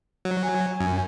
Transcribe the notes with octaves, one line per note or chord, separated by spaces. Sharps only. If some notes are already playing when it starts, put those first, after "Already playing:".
F#3
G#5
F#2